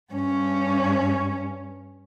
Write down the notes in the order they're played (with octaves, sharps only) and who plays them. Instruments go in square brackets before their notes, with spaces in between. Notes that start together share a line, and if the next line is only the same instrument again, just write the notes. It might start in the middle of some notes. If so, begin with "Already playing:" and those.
[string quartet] G2 C#4